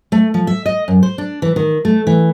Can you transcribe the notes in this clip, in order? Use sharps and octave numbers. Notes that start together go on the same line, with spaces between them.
A3
F3
E5
D#5
F#2
C5
D4
E3
D#3
A3
E3